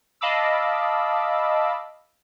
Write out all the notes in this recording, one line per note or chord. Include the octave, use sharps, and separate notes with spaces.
D#5 F5 A5 B5 D6 E6